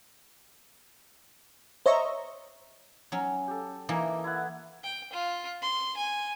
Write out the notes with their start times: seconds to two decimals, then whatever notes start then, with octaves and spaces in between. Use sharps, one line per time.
1.86 C5 C#5 D#5 E5 A#5 C#6
3.12 F#3 C#4
3.48 G4 A4
3.89 E3 A#3 D#5 E5 D6
4.24 E4 F#5
4.84 G5
5.13 F4
5.62 C6
5.97 G#5